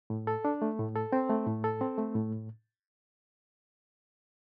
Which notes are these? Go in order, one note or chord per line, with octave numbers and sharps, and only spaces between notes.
A2
A4
D4
A3
A2
A4
C4
A3
A2
A4
C4
A3
A2